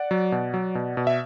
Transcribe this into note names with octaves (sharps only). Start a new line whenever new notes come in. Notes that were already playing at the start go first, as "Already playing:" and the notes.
Already playing: D5 F#5
F#3
B2
F#3
B2
B2
E5